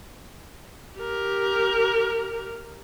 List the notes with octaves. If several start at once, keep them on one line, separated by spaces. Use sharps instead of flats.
G4 A#4